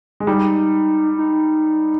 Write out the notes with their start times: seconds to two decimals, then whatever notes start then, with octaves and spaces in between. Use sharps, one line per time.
0.20 G#3
0.27 G3 D#4
1.18 D#4